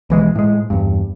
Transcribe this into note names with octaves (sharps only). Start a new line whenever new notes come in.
B1 E3 G#3
A2 G#3
E2 G2